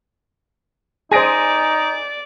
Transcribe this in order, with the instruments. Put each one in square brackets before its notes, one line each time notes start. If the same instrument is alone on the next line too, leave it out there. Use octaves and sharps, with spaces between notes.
[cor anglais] D#4 [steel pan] G#4 C5 [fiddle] D5 [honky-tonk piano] G#5 A#6 D7